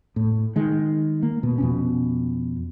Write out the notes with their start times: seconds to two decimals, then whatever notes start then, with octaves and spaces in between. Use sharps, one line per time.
0.16 A2
0.56 D#3 G#3
1.23 A#3
1.43 B2
1.58 F2 B2 C#4